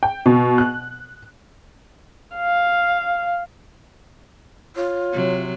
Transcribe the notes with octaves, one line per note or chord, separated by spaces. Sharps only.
G5
B2
F#6
F5
F4 C#5
C3 F#3